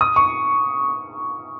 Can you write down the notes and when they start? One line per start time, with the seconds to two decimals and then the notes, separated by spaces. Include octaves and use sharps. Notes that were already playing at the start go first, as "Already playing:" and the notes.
0.01 D#6
0.16 C#6